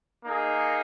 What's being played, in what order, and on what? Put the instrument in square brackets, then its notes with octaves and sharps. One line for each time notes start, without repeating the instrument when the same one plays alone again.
[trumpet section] A#3 D#4 G#4